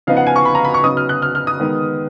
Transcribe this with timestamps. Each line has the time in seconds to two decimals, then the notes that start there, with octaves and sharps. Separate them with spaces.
0.07 C#3 F3 B3 D#4 F5
0.17 F#5
0.27 G#5
0.36 C#6
0.45 B5
0.55 A#5
0.65 B5
0.74 C#6
0.83 C#3 F#3 B3 D#4 D#6
0.97 F6
1.09 F#6
1.22 F6
1.35 F6
1.47 D#6
1.60 D#3 G#3 B3